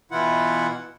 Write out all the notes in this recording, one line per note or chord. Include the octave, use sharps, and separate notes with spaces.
B2 E3 E4 F4 F#5